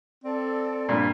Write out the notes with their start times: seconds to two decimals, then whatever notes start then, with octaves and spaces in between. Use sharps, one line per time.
0.24 C4 A4 D5
0.89 G2 A#2